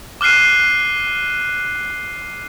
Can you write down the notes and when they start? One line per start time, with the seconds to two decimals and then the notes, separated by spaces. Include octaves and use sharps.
0.21 D6 F6 F#6 C7 D#7